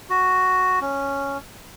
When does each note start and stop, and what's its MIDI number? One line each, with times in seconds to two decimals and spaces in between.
0.10 0.79 66
0.81 1.38 61